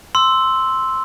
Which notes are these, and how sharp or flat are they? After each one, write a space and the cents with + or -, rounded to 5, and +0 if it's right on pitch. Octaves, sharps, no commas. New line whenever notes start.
C6 +0 E6 -5